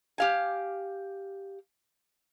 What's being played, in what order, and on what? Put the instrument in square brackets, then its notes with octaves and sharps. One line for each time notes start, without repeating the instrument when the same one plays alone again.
[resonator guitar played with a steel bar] G4 F5 G#5